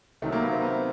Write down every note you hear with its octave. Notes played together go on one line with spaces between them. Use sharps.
C3 D#3 F#3 A3
A#3
B3
C4
B3